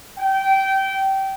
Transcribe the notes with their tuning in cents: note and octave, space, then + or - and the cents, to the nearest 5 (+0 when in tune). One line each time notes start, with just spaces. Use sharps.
G5 -20